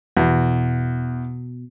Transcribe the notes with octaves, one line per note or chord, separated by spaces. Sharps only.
E2 B2